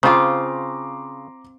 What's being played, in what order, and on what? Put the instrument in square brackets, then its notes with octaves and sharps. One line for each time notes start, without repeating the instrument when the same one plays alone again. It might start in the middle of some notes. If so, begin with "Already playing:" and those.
[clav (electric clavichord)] C#3 [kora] C4 F4 [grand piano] A#5 C6 D6